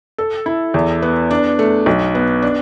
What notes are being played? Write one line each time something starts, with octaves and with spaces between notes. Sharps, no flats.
A4
E4
E2
B3
D4
A3
B1
B3
D4